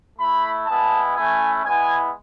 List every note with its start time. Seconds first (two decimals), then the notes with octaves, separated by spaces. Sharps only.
0.18 A3 E4 B5
0.67 G#3 B3 E4 A5
1.15 A3 C#4 E4 G#5
1.64 G#3 B3 E4 G#5